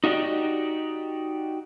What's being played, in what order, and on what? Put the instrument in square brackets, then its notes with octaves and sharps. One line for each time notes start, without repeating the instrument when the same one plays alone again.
[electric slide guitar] D#4 F#4 G4 D5 D#5